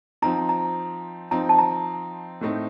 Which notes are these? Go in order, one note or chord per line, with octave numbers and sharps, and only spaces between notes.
F3 C4 D#4 A#5
A#5
F3 C4 D#4 A#5
A5
A#5
A2 A3 C4 D#4